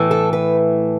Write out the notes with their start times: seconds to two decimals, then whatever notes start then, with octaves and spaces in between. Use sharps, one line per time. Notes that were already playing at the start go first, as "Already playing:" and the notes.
Already playing: A2 E3 A3
0.11 A4
0.33 B4